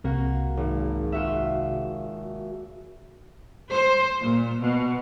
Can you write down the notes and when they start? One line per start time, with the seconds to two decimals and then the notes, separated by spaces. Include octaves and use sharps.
0.04 C2 C3 A#3 F#4
0.57 G#1
1.12 F4 F#4 E5
3.72 C5
4.21 A#2
4.60 B2